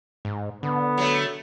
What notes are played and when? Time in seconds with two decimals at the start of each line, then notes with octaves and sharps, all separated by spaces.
0.25 G#2
0.63 D3 B3
0.98 F#3 A3